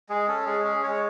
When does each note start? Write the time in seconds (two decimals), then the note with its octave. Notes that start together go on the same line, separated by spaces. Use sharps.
0.09 G#3 G#4
0.28 C#4 A4
0.46 G#3 G#4
0.64 C#4 G#4
0.83 G#3 C#5